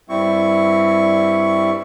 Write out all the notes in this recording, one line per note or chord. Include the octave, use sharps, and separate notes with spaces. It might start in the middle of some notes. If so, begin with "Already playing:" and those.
G2 G3 C4 E4 C#6